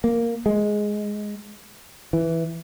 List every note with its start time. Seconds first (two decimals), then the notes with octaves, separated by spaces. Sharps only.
0.04 A#3
0.46 G#3
2.13 E3